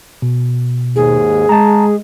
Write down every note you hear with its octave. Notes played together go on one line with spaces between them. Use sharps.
B2
D#2 G#2 G#4
G#3 A5 A#5